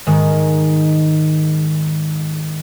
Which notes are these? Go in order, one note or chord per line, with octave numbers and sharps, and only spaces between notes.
G#2 D#3 G#3